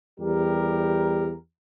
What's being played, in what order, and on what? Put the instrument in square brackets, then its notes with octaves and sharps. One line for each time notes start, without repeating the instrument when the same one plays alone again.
[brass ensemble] E2 G3 G4 A#4